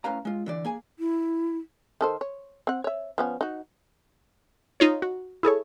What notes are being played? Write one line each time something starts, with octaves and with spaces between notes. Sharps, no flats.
A2 C#4 B4 F5 A#5
G#3 F4
D3 E3 D5
A#3 G#4 G#5
E4
D#3 A4 C5
C#5
C4 F#5
C#5 E5
F3 B3 C#4
D#4 F#4
D#4 F4 C#5
F#4
E4 G#4 A4 C#5